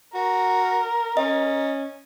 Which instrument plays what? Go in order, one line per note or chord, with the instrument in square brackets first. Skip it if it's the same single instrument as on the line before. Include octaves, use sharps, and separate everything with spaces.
[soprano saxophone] F#4 [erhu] A#4
[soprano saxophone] C#4 [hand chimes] D#5